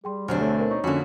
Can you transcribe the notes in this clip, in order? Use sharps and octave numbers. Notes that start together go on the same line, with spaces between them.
G3 G#4 G5 C6
D2 B2 F#3 C4 D4 G4 F6
A3 A4 C#5
A#4 C5 C#5
D#4 C#5 C#6
F2 D3 A#3 C#4 F#4